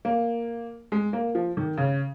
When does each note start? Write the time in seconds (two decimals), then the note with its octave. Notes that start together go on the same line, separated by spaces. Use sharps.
0.05 A#3
0.92 G#3
1.13 A#3
1.35 F3
1.57 D#3
1.77 C#3